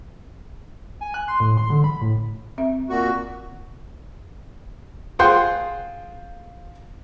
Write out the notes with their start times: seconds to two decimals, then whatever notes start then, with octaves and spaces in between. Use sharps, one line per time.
1.01 G#5
1.14 F#6
1.28 C6
1.40 A2
1.57 C6
1.70 D3
1.84 B5
2.01 A2
2.58 C4 E5
2.89 A#2 F#4
5.19 F4 G#4 C5 F#5 G5 C6